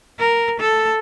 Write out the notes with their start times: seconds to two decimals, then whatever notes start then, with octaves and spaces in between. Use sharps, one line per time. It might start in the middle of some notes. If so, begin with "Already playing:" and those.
0.19 A#4
0.60 A4